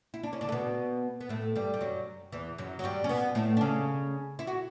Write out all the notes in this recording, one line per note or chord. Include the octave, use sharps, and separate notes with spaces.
E4
D4
C#4
D3 D4
A3
B2 B3
B3
A2 A3
G2 G3
G3
F#2 F#3
E2 E3
F#2 F#3
F#3
G2 G3
C#4
B2 B3
A2 A3
D4
C#3 C#4
E4
F#4